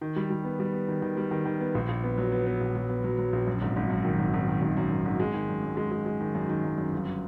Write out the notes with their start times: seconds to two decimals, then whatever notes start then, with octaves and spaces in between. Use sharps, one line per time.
0.01 D#3
0.16 G3
0.30 G3
0.44 B3
0.60 G3
0.73 B3
0.88 D#3
1.02 D#3
1.17 G3
1.31 D#3
1.45 D#3
1.60 B3
1.75 A#1
1.88 A#1
2.03 B3
2.18 F#3
2.32 B3
2.46 B3
2.60 A#1
2.76 F#3
2.89 B3
3.04 F#3
3.18 F#3
3.33 A#1
3.47 F#2
3.61 G#1
3.76 G#1
3.90 F#2
4.05 D#3
4.19 G#1
4.33 G#1
4.48 D#3
4.62 G#1
4.77 F#2
4.91 G#1
5.05 G#1
5.20 G#3
5.34 D#3
5.49 F#2
5.63 F#2
5.77 G#3
5.91 G#3
6.06 G#3
6.21 D#3
6.35 F#2
6.49 D#3
6.64 F#2
6.78 F#2
6.92 G1